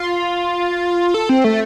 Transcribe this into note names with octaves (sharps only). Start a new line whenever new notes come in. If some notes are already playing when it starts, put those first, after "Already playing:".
Already playing: F4
A4
C4
A3